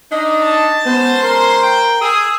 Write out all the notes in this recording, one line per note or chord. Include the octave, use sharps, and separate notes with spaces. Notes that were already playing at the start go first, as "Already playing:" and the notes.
D4 D#4 D#5
A5
G#3 B3 C#4 C5
A#4 C6
G5
G#4 D#6 E6